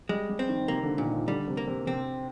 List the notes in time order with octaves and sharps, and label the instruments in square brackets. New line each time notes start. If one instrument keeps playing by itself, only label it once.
[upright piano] G3 [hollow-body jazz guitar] G#3
[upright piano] G3
[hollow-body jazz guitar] C4
[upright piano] D#3
[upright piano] C3 [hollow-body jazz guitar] A#3
[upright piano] D3
[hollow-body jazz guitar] A#2 [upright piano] D#3
[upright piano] F3
[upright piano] D3 [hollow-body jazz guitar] G3
[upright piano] C3
[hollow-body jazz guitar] A#3
[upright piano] C3
[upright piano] C3 [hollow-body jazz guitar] C4